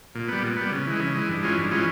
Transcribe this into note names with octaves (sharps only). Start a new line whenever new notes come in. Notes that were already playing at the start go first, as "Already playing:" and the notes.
A#2
G3 B3
A#2
G3 B3
C#3
E3 G#3
C#3
E3 G#3
G2
E3 G#3 C#4 F4
G2
E3 G#3 C#4 F4